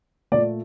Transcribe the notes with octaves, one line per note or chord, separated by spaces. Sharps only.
A#2 A3 D5